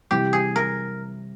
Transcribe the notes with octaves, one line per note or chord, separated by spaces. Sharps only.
C3 E3 G3 C4 G4
G#4
A#4